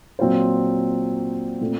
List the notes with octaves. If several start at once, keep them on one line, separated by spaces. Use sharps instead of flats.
A#2 F#3 C4 F4 C5
A#2 A3 C4